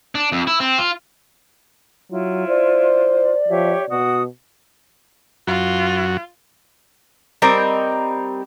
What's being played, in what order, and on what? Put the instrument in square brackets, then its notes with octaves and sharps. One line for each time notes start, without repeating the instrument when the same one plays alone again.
[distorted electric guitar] D4
F2
E4
C4
F4
[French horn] F#3 [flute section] E4 F4
[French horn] C5 [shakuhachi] D5
[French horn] F3 [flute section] G4 C#5 E5
[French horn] B2 [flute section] F#4 D#6
[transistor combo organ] F#2 F#4 [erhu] F4
[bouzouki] G3 C4 D#4 A#4